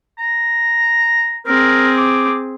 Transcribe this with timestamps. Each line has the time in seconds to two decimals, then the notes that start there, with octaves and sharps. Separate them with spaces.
0.18 A#5
1.47 C4 G#4 A#4
1.97 D6